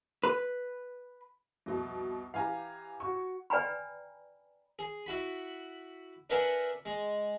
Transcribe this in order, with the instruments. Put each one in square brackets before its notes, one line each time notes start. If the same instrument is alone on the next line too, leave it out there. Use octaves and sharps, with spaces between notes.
[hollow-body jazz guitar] B4
[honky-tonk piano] C2 F2 B2
[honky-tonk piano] E3 G4 [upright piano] F5 G#5 A#5
[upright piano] F#4 C#6
[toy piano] B4 D5 G5 G#5 A#5 B5
[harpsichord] G#4
E4 F#4 B5
D4 A#4 B4 E5 F#5 G#5
G#3